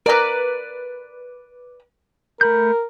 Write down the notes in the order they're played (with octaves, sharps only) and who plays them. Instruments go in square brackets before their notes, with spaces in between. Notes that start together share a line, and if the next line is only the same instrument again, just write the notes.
[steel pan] A#4 A#5 [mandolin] B4 D5
[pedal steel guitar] A3 B5 G6 [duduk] A#4